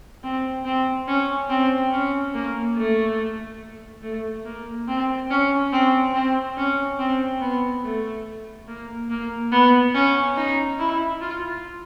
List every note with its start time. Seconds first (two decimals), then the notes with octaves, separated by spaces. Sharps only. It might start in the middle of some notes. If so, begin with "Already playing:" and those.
0.24 C4
0.65 C4
1.08 C#4
1.49 C4
1.92 C#4
2.34 A#3
2.77 A3
4.03 A3
4.46 A#3
4.88 C4
5.30 C#4
5.73 C4
6.14 C4
6.57 C#4
6.99 C4
7.41 B3
7.84 A3
8.68 A#3
9.10 A#3
9.52 B3
9.95 C#4
10.37 D#4
10.79 E4
11.21 F4